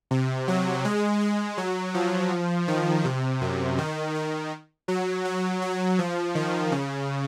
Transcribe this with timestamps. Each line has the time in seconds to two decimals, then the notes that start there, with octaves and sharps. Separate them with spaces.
0.11 C3
0.48 F#3
0.84 G#3
1.21 G#3
1.57 F#3
1.94 F3
2.68 D#3
3.05 C3
3.41 F#2
3.78 D#3
4.15 D#3
4.88 F#3
5.25 F#3
5.62 F#3
5.99 F3
6.35 D#3
6.72 C#3